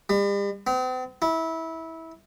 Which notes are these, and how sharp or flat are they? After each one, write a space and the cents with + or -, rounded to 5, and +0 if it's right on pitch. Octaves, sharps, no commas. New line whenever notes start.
G3 +40
C4 -45
E4 -20